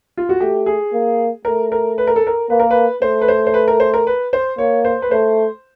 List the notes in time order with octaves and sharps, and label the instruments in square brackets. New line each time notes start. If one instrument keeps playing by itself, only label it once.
[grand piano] F4
F#4
[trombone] A3 [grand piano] G4
[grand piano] G#4
[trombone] A#3
[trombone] A3 [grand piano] A#4
[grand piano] A#4
B4
A#4
A4
A#4
[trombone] A#3 [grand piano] B4
[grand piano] A#4
B4
[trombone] A3 [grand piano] C5
[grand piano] B4
C5
C5
B4
A#4
C5
A#4
B4
C5
[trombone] A#3 [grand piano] C#5
[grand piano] C5
B4
[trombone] A3 [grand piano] C5